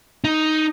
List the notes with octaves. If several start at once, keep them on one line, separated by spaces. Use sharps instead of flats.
D#4